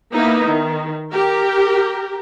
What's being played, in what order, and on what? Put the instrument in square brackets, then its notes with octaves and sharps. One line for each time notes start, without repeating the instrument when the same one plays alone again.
[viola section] A#3 B3 D#4 E4
D#3
G4 A#4